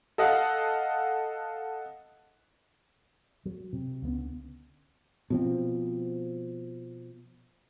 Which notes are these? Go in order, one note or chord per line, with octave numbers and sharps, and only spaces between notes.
A4 D#5 F5 F#5
F#3
C3
C#2 D3 B3 C#4
B2 F3 C4